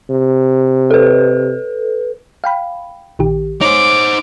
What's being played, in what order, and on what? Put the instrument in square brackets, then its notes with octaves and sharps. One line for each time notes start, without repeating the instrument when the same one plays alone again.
[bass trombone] C3
[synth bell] A4 B4
[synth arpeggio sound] F5 G5 B5
A#1 D#3 G4
[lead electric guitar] D#4 C5 [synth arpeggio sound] C#5 [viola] D6